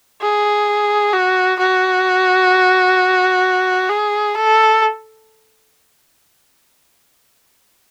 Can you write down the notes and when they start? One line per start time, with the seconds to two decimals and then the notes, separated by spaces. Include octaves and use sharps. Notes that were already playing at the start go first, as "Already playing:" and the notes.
0.21 G#4
1.13 F#4
1.59 F#4
3.89 G#4
4.35 A4